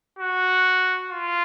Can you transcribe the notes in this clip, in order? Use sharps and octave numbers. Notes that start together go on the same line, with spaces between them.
F#4
F4